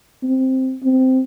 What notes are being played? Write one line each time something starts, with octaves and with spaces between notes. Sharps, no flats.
C4
C4